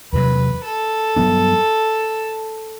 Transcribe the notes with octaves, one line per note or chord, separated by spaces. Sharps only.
E2 C3 F#3 B4
A4
G2 F#3 B3 D4